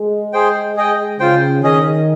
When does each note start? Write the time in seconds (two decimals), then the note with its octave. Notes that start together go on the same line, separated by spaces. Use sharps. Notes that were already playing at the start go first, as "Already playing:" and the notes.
Already playing: G#3
0.33 G#4 C5 G5
0.76 G#4 D#5 G5
1.20 C#3 F4 C5 G5
1.63 D#3 C#4 G#4 D#5